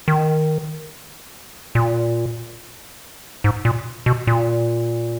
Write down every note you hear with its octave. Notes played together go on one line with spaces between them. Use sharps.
D#3
A#2
G#2
A#2
B2
A#2